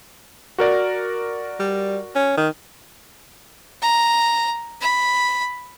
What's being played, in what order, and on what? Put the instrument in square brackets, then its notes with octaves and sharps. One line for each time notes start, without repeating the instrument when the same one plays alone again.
[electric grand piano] F#4 A#4 D5
[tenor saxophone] G3
C#4
D#3
[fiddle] A#5
B5